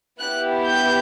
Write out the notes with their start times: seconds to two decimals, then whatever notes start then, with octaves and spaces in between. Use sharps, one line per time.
0.19 B3 E4 G4 F#6
0.66 G6